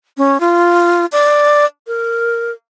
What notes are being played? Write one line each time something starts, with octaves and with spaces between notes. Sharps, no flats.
C#4
F4
D5
A#4